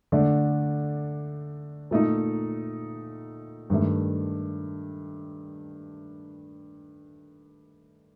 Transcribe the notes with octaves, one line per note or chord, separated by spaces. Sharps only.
D3 A3 D4
A#2 A3 D#4
G2 D#3 A3